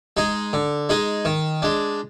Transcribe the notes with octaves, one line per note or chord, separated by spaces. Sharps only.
G#3 D#4 G#4
D3
G#3 D#4 G#4
D#3
G#3 D4